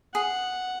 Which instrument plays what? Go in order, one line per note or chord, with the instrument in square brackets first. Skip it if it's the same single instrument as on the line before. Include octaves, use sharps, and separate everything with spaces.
[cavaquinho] G#4 [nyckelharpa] F#5